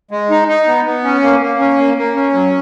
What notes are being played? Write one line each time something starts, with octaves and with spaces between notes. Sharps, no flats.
G#3
D#4
D#4
B3
B3
C#4
A#3
A#3
C#4
A#3
A#3
C#4
F#3